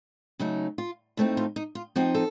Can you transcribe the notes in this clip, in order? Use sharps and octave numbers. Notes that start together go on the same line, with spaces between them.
C#3 F#3 A3 D#4
F4
A2 A3 C4 D#4
F4
D#4
F4
F3 C4 D#4 F#4
A4